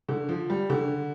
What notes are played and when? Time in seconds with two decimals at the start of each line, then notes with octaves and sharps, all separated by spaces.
0.09 D3
0.29 F3
0.50 G3
0.70 D3